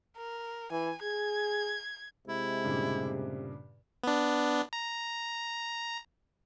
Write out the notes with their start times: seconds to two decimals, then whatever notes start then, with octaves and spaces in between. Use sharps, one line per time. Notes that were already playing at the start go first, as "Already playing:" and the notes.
0.17 A#4
0.72 E3 G#5
1.03 G#4 G#6
2.27 C3 G#3 E4
2.64 G2 A#2 C#3
4.03 B3 D4
4.73 A#5